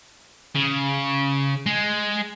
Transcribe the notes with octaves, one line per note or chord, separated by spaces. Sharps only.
C#3
G#3